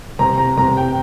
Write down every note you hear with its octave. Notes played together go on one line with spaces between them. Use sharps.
C3 A#5
A#5
C3 A#5
G5